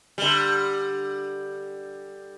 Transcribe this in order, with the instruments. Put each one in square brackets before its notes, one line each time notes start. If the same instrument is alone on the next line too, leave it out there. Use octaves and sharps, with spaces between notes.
[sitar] D3 G3